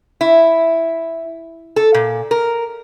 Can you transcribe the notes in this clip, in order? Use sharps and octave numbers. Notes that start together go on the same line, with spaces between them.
E4
A4
A#2
A#4